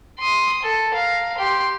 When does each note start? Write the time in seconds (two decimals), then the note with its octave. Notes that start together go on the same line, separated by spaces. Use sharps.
0.19 C6 D#6
0.62 A4
0.93 F5 A#5
1.37 G4 C6